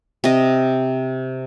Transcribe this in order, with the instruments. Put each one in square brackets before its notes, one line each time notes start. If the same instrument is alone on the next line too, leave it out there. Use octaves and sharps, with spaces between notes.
[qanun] C3 D#5